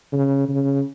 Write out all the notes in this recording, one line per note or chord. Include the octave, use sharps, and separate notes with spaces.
C#3
C#3